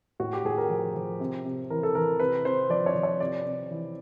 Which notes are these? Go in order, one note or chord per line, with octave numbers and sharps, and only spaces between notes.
A2 F#4
G4
A2 G#4
A#4
F3
F3
C3
C3
E3 A#4
A4
E3 A#4
C3 B4
C3 C5
F3 D5
C#5
F3
C#5
C3 D5
C3
E3